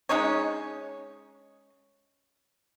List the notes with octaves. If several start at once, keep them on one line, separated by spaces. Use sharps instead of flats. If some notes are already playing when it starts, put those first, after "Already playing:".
G#3 C#4 D#4 C#5